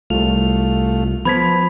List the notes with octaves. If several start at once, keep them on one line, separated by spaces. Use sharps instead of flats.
C2 A3 F4 F7
F3 B3 B5 G#6 B6